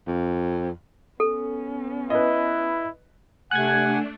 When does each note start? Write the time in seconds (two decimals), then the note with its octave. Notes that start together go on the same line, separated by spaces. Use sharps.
0.07 F2
1.20 B3 C#4 A4
2.10 E4 B4 D#5
3.51 C3 A3 D4 F#5 G#5 F#6 G#6